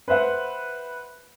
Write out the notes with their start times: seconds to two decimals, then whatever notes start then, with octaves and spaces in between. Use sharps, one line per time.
0.08 B4 C5 E5 F#5